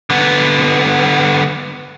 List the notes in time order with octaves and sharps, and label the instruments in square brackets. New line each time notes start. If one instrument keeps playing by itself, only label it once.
[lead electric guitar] D3 B3